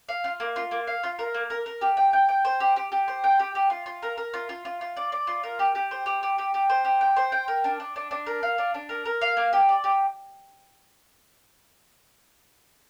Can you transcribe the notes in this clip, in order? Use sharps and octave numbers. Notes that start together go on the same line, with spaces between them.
F5
F4
A#3
F4
A#3
F5
F4
A#4
A#3
A#4
A#4
G4
G5
G5
G5
C5
G4
G4
G4
C5
G5
G4
G4
F4
F4
A#4
A#4
F4
F4
F4
F4
D5
D5
F4
A#4
G4
G4
C5
G4
G4
G4
G4
C5
G4
G5
C5
G5
A#4
D4
D4
D4
D4
A#4
F5
D4
D4
A#4
A#4
F5
A#3
G4
D5
G4